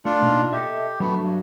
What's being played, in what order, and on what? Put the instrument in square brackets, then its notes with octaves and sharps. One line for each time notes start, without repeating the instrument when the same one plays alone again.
[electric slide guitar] A3 [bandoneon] D4 F4
[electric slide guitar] B2 A#3 D#4
[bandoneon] G4 [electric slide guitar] A4 D#5 E5
[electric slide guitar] F#3 D4 F#4 [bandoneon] A3 B3
[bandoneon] G2